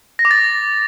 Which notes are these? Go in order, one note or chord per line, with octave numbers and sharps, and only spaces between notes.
A#6
D6
A6